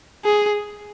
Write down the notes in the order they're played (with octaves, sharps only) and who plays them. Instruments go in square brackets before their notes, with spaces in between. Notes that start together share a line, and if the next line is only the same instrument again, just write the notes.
[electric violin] G#4